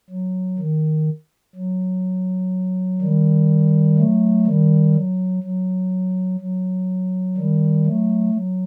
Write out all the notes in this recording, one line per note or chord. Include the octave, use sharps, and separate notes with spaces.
F#3
D#3
F#3
D#3 G3
F#3 A3
D#3 G3
F#3
F#3
F#3
D#3 G3
F#3 A3
F#3